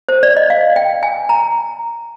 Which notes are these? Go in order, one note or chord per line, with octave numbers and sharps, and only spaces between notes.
C5
D5
D#5
F5
G5
G#5
A#5